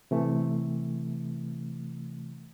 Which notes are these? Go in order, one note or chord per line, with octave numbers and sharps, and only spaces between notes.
C3 E3 A3